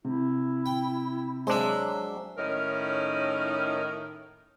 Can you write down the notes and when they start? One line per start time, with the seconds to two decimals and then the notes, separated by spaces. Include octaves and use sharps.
0.04 C3 E4
0.66 G5
1.47 F#3 G#3 D4 C5 E5
2.38 A2 D#3 C#4 D#4 A#4